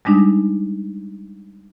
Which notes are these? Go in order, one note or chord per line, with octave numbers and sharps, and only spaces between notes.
G3 G#3 D4 D#4